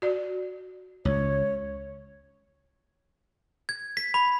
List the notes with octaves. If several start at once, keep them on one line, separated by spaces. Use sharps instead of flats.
F#4 D5
C#2 C#5
G#6
B6
B5